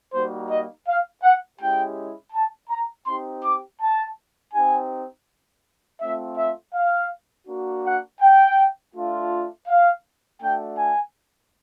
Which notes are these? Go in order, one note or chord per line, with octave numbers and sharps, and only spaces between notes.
G3 A#3 D#4 F#4 C5
D#5
F5
F#5
G#3 C#4 E4 G4 G5
A5
A#5
C4 D#4 G4 C6
D6
A5
C4 D#4 G4 G#5
A3 C4 F4 E5
E5
F5
A#3 D4 F#4
F#5
G5
A3 D4 F4
F5
A3 D4 F#4 G5
G#5